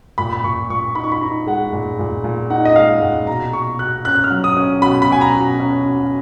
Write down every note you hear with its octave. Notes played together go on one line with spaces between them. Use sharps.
A#2 B5
B5
A#2 C#6
A#2 C#6
D#4 B5
C#6
B5
D#4 A#5
G#3 F#5
A#2
A#2
A#2
D#4 F#5
D#5
G#3 F5
A#2 F#5
B2 A#5
B2 C#6
B2 F#6
C#4 F#6
F#6
F6
F#3
D#6
C#4
B2 B5
B5
B2 G#5
A#5
B2
A#5
C#4
B2